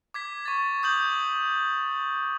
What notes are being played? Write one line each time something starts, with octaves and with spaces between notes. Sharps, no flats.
D6 G#6 B6
C#6 A6
D#6 G6 F#7